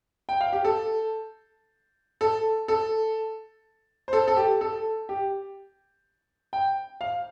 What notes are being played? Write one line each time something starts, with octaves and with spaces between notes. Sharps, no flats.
G5
F5
G4
A4
A4
A4
C5
A4
A4
G4
A4
G4
G5
F5